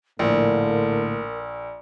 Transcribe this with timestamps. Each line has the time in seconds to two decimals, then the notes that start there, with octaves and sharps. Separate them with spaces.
0.19 A#1 A2 D3 A#3 A#4